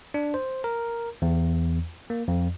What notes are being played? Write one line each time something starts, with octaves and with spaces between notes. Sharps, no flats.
D4
C5
A#4
E2
A#3
F2